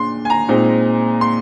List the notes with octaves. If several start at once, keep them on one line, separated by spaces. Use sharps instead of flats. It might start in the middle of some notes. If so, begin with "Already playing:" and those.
Already playing: A#2 G#3 D4 C6
G#5
A#5
A#2 G#3 C4 D#4
C6